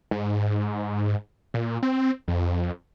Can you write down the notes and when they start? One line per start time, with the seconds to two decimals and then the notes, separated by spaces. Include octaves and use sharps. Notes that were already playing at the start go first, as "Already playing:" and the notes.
0.11 G#2
1.54 A#2
1.83 C4
2.28 F2